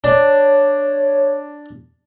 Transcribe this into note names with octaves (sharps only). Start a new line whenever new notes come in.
D4 C#5